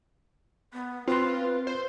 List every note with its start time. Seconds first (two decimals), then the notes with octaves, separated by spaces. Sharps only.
0.73 B3
1.08 C4 F4 B4 C6
1.67 C5